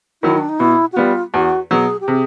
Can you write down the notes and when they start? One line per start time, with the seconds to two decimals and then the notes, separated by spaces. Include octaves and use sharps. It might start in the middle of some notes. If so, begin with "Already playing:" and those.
0.22 D#3 F#3 E4
0.38 D4
0.49 D#4
0.60 B2 E4
0.92 F#4
0.97 G3 B3 F4
1.34 E2 F#4
1.71 B2 F#3 G#4
2.01 G4
2.08 C3 G#4